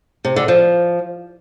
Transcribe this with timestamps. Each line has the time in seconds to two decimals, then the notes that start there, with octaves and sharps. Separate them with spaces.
0.25 C3
0.36 D3
0.48 F3